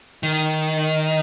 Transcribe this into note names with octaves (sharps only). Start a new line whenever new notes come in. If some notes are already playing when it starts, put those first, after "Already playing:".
D#3